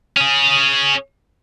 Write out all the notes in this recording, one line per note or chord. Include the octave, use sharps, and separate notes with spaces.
C#4 G#4